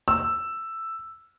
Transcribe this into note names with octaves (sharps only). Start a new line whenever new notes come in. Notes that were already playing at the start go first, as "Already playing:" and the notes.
E6